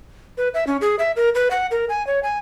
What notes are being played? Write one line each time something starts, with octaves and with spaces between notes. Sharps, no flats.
B4
E5
C#4
G#4
E5
A#4
B4
F#5
A#4
G#5
C#5
G#5